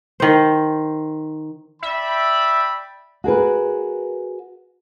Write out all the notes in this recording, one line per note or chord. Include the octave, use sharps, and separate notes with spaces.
D#3 C5
D5 E5 G5 B5
F#4 G#4 A#4 B4